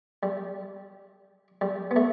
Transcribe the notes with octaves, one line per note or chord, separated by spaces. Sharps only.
G3
G3
B3
A3